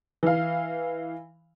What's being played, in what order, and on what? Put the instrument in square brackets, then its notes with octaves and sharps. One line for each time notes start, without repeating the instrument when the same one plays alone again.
[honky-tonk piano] E3 F5